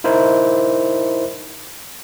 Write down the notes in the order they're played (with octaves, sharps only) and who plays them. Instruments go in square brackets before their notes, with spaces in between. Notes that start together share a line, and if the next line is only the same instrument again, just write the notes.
[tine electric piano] D#4 E4 A#4 C5